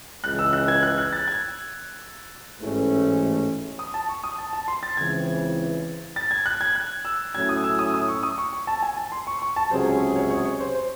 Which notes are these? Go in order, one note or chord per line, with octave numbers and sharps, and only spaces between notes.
C#2 C#3 E3 F#6
E6
F#6
G#6
F#6
F#6
A6
G#6
A1 G#2 E3 A3 C#4
D#6
A5
C#6
D#6
A5
A5
C6
A6
C#2 C#3 E3 C4 G#6
A6
G#6
F#6
G#6
F#6
E6
A2 F#3 C#4 E4 G#6
D#6
E6
D#6
D#6
C#6
D#6
C#6
C#6
A5
G#5
A5
C6
C#6
C#6
A5
C#2 C3 F#3 C#4 G#4 C5
C#5
C#5
C#5
C#5
C5
C5